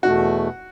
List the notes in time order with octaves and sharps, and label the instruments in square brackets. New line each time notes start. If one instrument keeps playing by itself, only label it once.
[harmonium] E2 B2 A3 [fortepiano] F#4